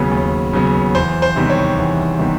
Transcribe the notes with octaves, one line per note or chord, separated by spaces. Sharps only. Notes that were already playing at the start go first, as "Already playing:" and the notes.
Already playing: D#2 C#3 F#3 B3
D#2
C#3 F#3 B3
E2 C5
C5
C3 D#3 G3 B3
C#5
E2
C3 D#3 G3 B3